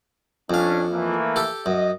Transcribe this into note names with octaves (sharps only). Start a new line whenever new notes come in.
F2 C#4 D4 F5
E3 A3 A#3
G4 A4
F#2 D#5